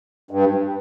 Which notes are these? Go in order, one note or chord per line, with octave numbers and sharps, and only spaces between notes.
G2